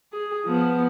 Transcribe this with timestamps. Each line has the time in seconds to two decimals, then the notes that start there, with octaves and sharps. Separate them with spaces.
0.13 G#4
0.45 F3 B3